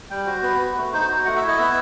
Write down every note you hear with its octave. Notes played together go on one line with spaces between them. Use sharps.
G3 G5
F#4 C5
B3 B4
F#4
A3
D#4 C5
F#4
A3 F#5
E4 E5
D#5
B3 E5